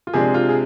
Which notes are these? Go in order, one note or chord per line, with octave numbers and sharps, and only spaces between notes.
F4
C3 F3 G#3 D4 G#4
F4
G#4